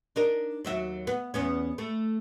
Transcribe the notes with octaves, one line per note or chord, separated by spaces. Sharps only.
D4 D#4 A#4
D#2 F#3 E5
B3
E2 B3 C#4
A3